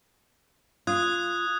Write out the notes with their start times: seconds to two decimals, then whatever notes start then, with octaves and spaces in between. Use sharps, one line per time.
0.87 F4 D#6 F#6 G#6